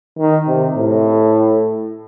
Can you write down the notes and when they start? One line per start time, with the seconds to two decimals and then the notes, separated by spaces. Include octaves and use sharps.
0.19 D#3
0.47 C3
0.76 A2